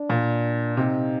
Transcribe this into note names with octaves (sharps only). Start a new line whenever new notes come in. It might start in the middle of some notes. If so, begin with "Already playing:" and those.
Already playing: D4
A#2
C3 D#4